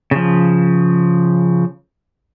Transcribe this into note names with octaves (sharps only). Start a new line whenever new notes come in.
C#3 F3